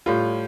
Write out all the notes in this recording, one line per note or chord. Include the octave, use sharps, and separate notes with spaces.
A2 G3 F4